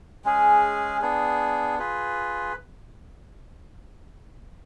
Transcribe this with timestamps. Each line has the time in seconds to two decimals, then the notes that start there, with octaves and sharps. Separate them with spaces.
0.25 G#3 C#4 G#4
1.02 B3 D4 G#4
1.79 F4 G#4 B4